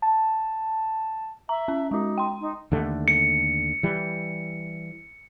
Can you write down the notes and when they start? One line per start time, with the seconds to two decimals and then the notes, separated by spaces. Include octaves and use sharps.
0.02 A5
1.49 E5 A#5
1.68 C#4
1.91 G#3 D#4 F#4
2.18 G5 C6
2.41 D#4
2.72 D#2 D3 A3
3.08 C#7
3.83 E3 G3